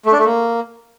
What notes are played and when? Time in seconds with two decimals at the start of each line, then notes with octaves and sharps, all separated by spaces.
0.06 A3
0.12 D4
0.19 A3
0.25 A#3